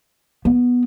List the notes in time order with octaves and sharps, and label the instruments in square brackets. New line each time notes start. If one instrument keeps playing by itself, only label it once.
[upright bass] B3